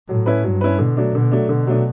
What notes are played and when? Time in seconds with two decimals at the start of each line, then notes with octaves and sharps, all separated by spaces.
0.09 A2 F#3
0.26 C#4 E4 B4
0.44 G2 F#3
0.61 C#4 E4 B4
0.79 B2 D3
0.97 F#3 A3 D4
1.14 B2 D3
1.31 F#3 A3 D4
1.49 B2 D3
1.67 F#3 A3 D4